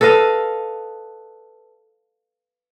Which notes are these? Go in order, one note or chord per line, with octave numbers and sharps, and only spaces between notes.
A4 B4 D#5 F5